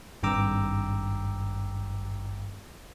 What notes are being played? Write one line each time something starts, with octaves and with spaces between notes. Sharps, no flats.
G#1 G2 G5 A#5 D6 E6